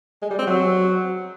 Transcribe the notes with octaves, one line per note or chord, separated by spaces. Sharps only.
G#3
G3
C4
F#3